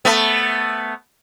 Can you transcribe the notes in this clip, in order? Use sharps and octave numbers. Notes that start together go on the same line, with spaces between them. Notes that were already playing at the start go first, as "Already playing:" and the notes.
A3 B3